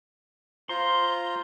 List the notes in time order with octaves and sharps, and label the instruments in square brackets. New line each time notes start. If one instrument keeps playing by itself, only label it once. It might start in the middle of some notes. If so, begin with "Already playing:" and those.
[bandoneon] F4 C5 A#5 [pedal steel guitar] C6